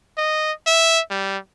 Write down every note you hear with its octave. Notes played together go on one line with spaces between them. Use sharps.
D#5
E5
G3